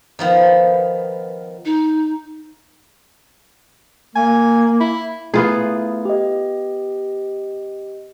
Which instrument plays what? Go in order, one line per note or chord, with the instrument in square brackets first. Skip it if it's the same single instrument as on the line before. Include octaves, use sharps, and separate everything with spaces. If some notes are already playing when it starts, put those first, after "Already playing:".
[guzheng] D#3 F3 B3
[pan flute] D#4
[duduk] A#3 [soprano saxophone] G#5
[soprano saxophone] E4
[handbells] A3 E4 [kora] B3 F4 G#4
[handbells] G4 D#5